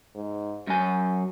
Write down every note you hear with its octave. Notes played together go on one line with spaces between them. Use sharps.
G#2
F#2 F#3 F#4 G#5